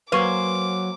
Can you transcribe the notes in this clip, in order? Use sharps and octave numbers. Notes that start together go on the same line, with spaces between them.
F#3 A#3 B4 C5 G#5 C#6 D6